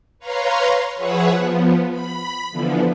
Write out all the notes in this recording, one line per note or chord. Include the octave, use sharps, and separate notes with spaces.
B4 C#5 F5 A#5 C6
F3 G#4 B4 C#5 E5 F#5
F3 B3
B5
D3 E3 F3 B3